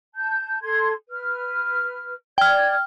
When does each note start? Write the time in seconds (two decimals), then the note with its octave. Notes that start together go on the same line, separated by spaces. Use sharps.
0.15 A5 G6
0.61 A4 C6 G#6
1.10 B4 F6
2.38 D5 G5 F6 G#6